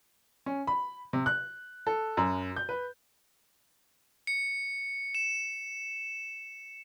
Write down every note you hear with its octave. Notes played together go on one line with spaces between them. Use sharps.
C#4
B5
C3
F#6
A4
F#2
G6
B4
C#7
E7